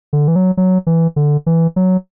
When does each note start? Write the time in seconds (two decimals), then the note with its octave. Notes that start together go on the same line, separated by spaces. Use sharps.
0.13 D3
0.28 E3
0.36 F#3
0.57 F#3
0.87 E3
1.16 D3
1.46 E3
1.76 F#3